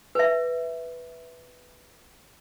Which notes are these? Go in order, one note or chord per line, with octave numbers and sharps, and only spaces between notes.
B4 E5